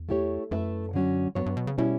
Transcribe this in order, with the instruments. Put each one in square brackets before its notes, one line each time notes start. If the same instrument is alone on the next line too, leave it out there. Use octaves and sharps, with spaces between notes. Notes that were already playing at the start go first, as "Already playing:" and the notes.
Already playing: [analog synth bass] E2
[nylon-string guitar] A3 E4 G4 C#5
[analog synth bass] F#2 [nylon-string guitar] A3 E4 B4 E5
[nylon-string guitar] D3 F#3 C#4 F#4
[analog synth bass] G2 [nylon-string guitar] F#3 B3 F#4 C#5
[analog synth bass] G2
B2
C#3
[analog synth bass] B2 [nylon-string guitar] G3 C#4 E4